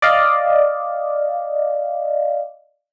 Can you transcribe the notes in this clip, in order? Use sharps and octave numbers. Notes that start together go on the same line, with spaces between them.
D5 D#5 F5